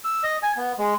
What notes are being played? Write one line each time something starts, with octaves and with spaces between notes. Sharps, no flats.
E6
D#5
G#5
B3
G#3